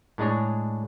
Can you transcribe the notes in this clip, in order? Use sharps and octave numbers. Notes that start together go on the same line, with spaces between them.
A2 G#3 D4 G#4 C#5